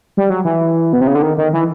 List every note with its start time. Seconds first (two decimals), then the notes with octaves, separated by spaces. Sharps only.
0.17 G3
0.30 F#3
0.45 E3
0.93 B2
1.01 C3
1.07 C#3
1.15 D3
1.22 D#3
1.38 D#3
1.53 E3